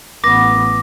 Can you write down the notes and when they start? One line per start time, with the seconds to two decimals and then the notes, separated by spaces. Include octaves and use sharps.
0.24 A1 B3 D6 A#6